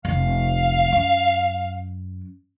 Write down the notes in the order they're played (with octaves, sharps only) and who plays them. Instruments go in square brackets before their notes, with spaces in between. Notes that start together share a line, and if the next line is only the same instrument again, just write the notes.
[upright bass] F1 [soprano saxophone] F5
[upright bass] F#2